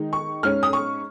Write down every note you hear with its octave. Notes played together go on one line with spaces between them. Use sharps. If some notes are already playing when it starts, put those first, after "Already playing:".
Already playing: D#3 G#3 D#4
C#6
G#2 G#3 C#4 F6
D#6
C#6